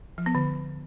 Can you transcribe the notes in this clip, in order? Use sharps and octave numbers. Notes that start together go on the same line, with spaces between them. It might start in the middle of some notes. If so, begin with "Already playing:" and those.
F3
B3
D3